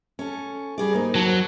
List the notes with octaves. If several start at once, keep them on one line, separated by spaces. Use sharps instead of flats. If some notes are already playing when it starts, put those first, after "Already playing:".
C#4 A4
G3 G#4 D5
G#2 A#3 D#4
F2 F#3 A5